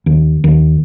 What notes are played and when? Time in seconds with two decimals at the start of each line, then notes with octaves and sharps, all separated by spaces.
0.06 D#2
0.44 D#2